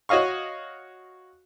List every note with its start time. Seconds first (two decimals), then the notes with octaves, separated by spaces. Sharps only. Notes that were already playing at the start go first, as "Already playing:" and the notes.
0.09 F#4 C#5 D#5 F5 C#6